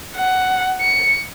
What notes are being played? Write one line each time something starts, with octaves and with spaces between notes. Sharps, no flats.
F#5
C#7